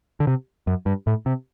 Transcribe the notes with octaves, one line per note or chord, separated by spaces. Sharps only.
D3
C3
F#2
G2
A2
C3